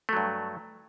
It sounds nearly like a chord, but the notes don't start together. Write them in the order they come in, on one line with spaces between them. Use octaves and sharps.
A3 F#3 G2